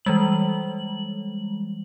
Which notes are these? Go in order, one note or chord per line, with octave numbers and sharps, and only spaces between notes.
E3 G3 G#3 F#7